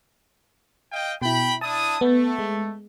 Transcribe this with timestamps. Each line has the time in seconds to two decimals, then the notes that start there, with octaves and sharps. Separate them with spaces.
0.92 D#5 F5 G5
1.22 B2 E4 G5 B5
1.61 D4 E4 A5 D#6
2.01 A3 B3
2.39 G#3